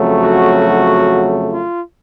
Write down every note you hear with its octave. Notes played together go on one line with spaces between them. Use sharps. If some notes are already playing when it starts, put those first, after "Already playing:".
Already playing: F2 C#3 F#3 A3
F#4
F4